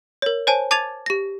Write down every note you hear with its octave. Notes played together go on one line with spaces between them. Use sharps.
A#4 C#5
C5 C#5 G#5 A5
A5 D6 G#6 A6 F7
G4 A#6